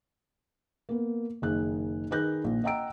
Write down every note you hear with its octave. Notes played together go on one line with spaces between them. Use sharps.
A#3 B3
F#1 D#3 G#4 F#6
D#3 G#4 B4 F#6 G6 A#6
A#1
D#5 F#5 G5 A#5 E6 D7